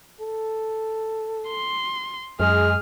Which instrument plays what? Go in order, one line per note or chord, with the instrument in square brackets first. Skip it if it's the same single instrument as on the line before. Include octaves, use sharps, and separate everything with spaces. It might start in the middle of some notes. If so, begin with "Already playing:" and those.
[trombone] A4
[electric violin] C6
[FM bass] F#2 [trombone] G#3 [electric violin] G#4 F6